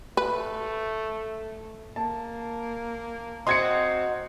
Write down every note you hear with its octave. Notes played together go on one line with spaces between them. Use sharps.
A3 B4
A#3 A5
C4 D#4 F#4 C6 G#6 C#7